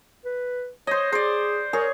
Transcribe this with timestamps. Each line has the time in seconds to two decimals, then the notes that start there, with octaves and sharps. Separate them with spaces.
0.25 B4
0.87 C5 C#5 D#5
1.12 G#4 C5 D5
1.73 G#4 A#4 C#5